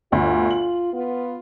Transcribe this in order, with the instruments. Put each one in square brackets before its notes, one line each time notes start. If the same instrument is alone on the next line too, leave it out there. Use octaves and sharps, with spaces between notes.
[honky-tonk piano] G1 D2 [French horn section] F4
[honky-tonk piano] F#7
[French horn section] B3 F4